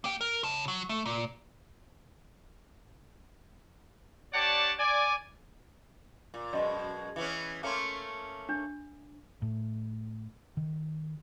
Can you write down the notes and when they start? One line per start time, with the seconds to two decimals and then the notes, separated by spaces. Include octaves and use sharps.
0.04 A#3 G5
0.21 A#4
0.43 C#3 A5
0.68 F#3
0.89 A3
1.06 A#2
4.34 D4 G4 C#5 D5 F#5 A5
4.79 D5 G#5
6.34 A#2
6.53 F#2 B2 G#3 D5 D#5 C6
7.16 E3 B3 C#4
7.63 A3 A#3 C#4 A5 C6
8.49 D4
9.42 A2
10.57 D#3